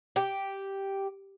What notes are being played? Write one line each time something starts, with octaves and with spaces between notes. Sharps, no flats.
G4